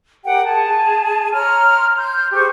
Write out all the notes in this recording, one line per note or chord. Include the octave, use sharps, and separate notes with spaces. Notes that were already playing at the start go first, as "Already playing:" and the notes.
G4 A#4 F#5 G5
G#4 A5
C#5 A#5 C6 F6
C6 F6 G6
G4 G#4 C5 C#6